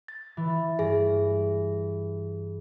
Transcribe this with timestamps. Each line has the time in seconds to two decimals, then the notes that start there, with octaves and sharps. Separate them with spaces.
0.08 A6
0.37 E3
0.79 G2 G#4